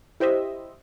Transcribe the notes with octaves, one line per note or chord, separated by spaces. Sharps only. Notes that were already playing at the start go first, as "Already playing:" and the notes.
E4 G4 C5 D#5 E5